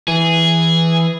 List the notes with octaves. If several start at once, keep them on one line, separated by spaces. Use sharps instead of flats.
E3 G#4